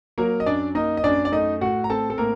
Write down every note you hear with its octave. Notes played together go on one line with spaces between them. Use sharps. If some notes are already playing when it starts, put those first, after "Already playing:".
F#3 A#3 A#4
D#5
F#2 D4 D5
A#3 D#4 D#5
D#5
F#2 D4 D5
D5
A3 D#4 D#5
A2 F#4 F#5
A#5
C4 A4 A5
A4
A2 A#3 A#4